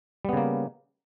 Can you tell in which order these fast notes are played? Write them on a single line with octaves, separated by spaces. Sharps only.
G3 B3 C#3 A#3